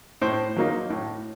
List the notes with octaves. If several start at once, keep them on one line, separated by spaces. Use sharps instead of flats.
A2 C5
F#3 A#3 D#4
A2